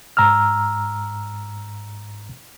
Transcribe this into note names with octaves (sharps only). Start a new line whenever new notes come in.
G#2 A#5 E6 F6